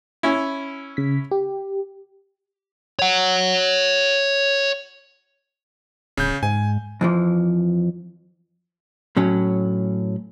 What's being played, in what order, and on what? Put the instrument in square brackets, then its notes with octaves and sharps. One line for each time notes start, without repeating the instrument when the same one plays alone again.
[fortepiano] C#4 E4
[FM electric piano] C#3 B6
G4
[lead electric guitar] C#5 F#5
[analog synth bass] D1 [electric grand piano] C#3 G6
[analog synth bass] G#2 [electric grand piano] G#5
[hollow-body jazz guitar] F2 E3 F3
A2 F#3 C#4